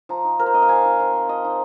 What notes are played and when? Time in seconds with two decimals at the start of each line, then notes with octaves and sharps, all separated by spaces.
0.09 F3 A#5
0.24 D#4
0.39 F3 A#4
0.46 C5
0.54 C4 D#5
0.62 F5
0.69 F3 G#5
0.84 D#4
0.99 F3
1.14 C4
1.29 F3 D#5
1.45 D#4